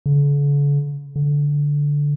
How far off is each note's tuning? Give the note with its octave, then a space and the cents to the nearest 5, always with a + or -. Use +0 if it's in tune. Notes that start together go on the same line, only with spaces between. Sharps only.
D3 -45
D3 -10